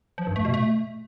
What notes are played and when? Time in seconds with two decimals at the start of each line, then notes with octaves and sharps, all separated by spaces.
0.18 F3
0.27 G2
0.36 A3
0.45 B2
0.54 A3